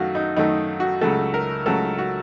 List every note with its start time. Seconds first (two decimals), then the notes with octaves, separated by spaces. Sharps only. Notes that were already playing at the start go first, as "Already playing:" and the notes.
Already playing: F#2 D#3 A3 F#4 F5
0.15 D#4
0.36 F#2 D#3 A3 D#4
0.80 F#4
1.01 C#2 C#3 F#3 A3 A4
1.34 A#4
1.66 C#2 C#3 F#3 A3 A4
1.98 F#4